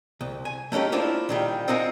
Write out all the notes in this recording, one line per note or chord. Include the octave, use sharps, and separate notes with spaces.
C2
G#5
A3 A#3 C#4 D#4 G4
A#3 D4 E4 F4 C5
A#2 D#3 G3
C4 D#4 F4 A#4 F#5 G#5